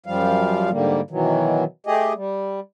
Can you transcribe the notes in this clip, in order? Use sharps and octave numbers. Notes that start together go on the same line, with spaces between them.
F#2 F3 G3 F5
G#2 D3 G3 A#3
B2 D#3 E3 F#3
A3 G4 G#4 D#5
G3